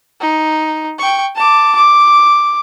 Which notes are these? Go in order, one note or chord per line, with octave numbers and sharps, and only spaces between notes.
D#4
G5 C#6
A5 D6
D6